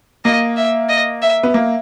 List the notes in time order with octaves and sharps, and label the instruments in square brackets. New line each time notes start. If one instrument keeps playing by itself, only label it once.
[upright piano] A#3 [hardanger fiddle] D#5
[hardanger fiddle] E5
D#5
E5
[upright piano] B3
A#3